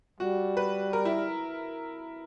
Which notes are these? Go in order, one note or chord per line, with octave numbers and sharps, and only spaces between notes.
G3 F#4
B4
A#4
E4